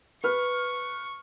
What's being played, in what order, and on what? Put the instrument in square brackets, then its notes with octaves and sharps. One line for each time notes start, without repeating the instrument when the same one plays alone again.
[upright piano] B4 F6 [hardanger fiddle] C#6